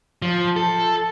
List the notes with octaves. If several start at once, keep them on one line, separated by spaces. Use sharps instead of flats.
F3
A4